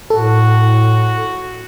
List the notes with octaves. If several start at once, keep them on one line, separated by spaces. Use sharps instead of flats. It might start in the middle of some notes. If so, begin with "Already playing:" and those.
A2 F#4 A4